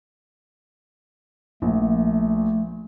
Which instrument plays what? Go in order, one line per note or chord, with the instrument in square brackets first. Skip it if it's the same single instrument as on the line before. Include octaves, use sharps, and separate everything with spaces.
[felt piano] A#1 [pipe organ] A3